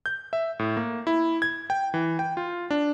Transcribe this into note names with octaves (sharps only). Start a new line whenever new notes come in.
G6
E5
A2
A#3
E4
G#6
G5
E3
G5
F4
D4